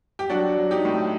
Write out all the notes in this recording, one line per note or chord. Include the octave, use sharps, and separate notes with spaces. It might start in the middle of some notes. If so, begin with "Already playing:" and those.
G4
F#3 D4 F#4
F#3
D#4 G4
A2